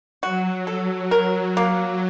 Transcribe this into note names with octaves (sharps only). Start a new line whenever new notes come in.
F#3 F#4
A4
A#4
A#3